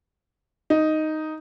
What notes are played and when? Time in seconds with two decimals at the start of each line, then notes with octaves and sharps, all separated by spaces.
0.70 D#4